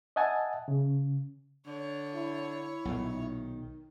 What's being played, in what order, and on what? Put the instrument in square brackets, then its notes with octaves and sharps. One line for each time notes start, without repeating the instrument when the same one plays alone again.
[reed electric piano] D#5 E5 F#5 G#5 A5
C#3
[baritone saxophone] D3 [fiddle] C#5
[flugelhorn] E4
[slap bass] B1 A#2 [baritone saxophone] D#3